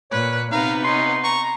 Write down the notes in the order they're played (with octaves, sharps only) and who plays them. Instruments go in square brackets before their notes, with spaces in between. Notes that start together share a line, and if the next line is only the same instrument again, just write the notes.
[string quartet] A#2 [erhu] B4 [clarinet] C#5
[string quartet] C3 B3 B4 [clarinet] D#4 [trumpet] F5 [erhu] A#5
[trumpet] C#4 [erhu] D#4 [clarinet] C6
[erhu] A#5 [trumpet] C#6